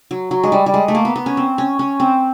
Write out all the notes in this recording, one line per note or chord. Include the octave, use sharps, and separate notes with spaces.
F#3
F#3
G#3
G3
G3
G#3
A3
A#3
B3
B3
C#4
C4
C#4
C#4
C4